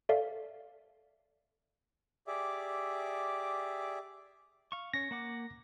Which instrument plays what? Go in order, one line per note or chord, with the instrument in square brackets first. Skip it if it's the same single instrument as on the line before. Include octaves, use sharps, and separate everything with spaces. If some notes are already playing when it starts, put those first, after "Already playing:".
[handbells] A4 D5 E5 F5
[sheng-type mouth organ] G4 G#4 D5 E5 D6
[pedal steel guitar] F5 C#6
[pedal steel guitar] C#4 C#5 [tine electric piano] A#6
[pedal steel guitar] A#3 F#5 D6